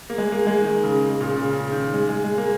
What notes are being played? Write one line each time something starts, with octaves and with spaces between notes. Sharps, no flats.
A#3
G#3
A#3
G#3
D#3
C#3
C#3
A#2
C#3
C#3
D#3
G#3
G#3
G#3
A#3